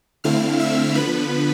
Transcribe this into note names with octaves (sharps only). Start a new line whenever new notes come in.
D3 A3 C4 E4 F5 F6
E5 E6
D3 F3 B3 B4 B5